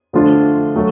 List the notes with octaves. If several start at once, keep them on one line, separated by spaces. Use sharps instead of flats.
D3 F3 A3 D4 F4
F#3 A3